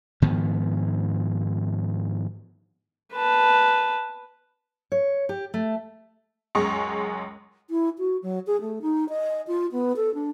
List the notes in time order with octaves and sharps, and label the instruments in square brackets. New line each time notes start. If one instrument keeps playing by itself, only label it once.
[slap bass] G#2 D#3 F3 B3
[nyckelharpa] B4 A5
[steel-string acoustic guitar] C#5
G4
A3
[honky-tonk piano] C#2 F#2 G#3 C#6
[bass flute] E4
F#4
F#3
G#4
A3
D#4
D#5
F4
B3
A4
D4